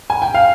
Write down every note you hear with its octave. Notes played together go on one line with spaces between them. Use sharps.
G#5
G5
F5